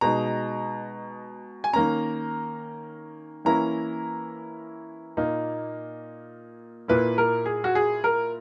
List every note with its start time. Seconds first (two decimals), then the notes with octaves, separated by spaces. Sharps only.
0.01 B2 G#3 D#4 A#5
1.64 G#5
1.73 D#3 A#3 C#4 A#5
3.45 E3 A#3 C#4 E4 A#5
5.17 A#2 A#3 D#4
6.88 A#2 A#3 E4 B4
7.18 A#4
7.46 G#4
7.64 F#4
7.75 G#4
8.04 A#4